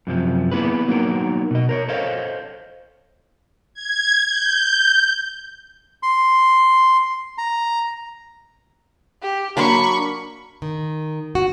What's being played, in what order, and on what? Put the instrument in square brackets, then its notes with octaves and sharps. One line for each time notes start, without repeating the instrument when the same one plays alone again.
[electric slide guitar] F#2 C3 F3
A#3 B3 E4 G#4 B4
F#3 A#3 B3 D#4 A#4
B2 D#5
A#4 C5 C#5
A4 C5 C#5 D#5 F5
[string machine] G#6
G6
[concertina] C6
A#5
[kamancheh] G4
[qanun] F#3 A#3 D4 [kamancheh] B5 C#6
[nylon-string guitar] D#3
F#4